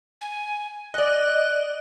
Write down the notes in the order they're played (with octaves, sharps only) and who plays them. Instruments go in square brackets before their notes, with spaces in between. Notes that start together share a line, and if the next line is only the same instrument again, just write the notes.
[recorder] G#5
[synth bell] D5 D#5 [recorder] F#6